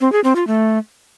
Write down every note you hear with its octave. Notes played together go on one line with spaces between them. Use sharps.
C4
G#4
C4
F4
A3